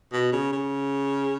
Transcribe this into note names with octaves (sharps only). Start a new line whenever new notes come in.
B2
C#3
C#3